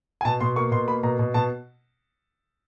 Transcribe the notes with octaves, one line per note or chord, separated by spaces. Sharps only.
G#5
B2 A5
B2 C6
A#3 C#6
B2 C6
A#3 B5
B2 A#5
B2
B2 A5